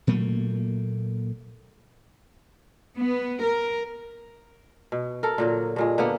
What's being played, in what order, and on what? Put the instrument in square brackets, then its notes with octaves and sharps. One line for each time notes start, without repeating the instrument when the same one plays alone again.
[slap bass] A#2 F#3 A3 A#3
[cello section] B3
A#4
[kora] B2
A4 A#4
A#2 D3 F#3
G2 A#2 G#3
D3 A#3 B3